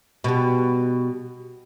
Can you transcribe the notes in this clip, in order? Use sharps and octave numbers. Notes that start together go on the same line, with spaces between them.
B2 G3